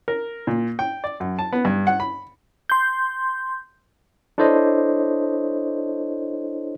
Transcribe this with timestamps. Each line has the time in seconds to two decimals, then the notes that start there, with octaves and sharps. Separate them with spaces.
0.08 A#4
0.47 A#2
0.79 G5
1.04 D5
1.20 F#2
1.39 A5
1.53 B3
1.65 G2
1.87 F#5
2.00 B5
2.70 C6 G6
4.38 D4 E4 A4 C5 C#5 D#5